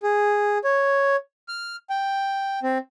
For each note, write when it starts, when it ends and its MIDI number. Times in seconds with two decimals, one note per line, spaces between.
0.03 0.58 68
0.64 1.16 73
1.48 1.76 89
1.90 2.59 79
2.63 2.78 60